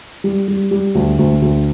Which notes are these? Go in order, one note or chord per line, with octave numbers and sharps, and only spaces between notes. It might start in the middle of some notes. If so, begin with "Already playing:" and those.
G3
G3
G3
D2
D2
D2